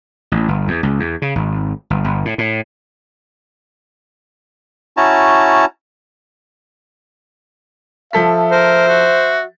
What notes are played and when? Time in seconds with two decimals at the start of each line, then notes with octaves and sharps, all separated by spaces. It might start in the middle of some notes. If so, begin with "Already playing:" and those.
0.32 A1
0.48 G1
0.68 E2
0.83 C#2
1.00 E2
1.22 C#3
1.35 G#1
1.90 G1
2.04 G1
2.25 A2
2.38 A2
4.97 C#4 E4 F#4 A5 A#5
8.13 F3 A4 E5 B6
8.51 A#4 C5
8.88 F#4